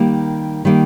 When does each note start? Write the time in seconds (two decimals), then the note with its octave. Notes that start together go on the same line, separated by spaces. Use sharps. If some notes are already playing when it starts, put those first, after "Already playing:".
Already playing: D#3 G3 A#3
0.65 D#3 G3 A#3